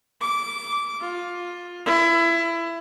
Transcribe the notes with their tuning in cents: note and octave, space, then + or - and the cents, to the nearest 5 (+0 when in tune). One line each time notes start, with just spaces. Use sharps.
D6 -15
F4 +15
E4 +25